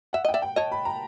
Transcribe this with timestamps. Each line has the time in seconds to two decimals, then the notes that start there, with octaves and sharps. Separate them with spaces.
0.13 E5 F#5
0.25 D#5 G5
0.34 D5 E5
0.42 G5
0.56 C#5 D#5 A5
0.72 B5
0.85 A#5